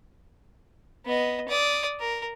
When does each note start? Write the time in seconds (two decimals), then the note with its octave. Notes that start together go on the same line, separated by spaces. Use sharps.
1.06 B3 D#5
1.49 D5 D#6
2.00 A#4